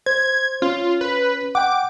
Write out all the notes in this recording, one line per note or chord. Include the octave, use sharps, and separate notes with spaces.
C5 G#6
C#4 F4
B4
F#5 G5 D6